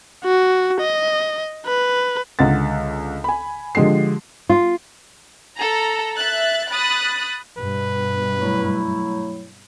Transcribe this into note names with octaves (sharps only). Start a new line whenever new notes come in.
F#4
D#5
B4
C#2 D3 F#5 A6
G#5 B5
D3 F3 G#3 G4 C7
F4
A4 A#5
E5 F#6 A6
B5 D#6 F#6 A6
G2 B2 G3 B4
F#3 A3 E4